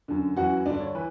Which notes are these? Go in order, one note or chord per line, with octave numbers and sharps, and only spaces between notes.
F#2 D3
F#2 E3 F#4 F#5
G2 D3 D4 D5
C#5
E3 B4